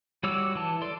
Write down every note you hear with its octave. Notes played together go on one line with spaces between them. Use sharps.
G3 F#4 C#5 D6 E6
E3 A5
A4 D5 C6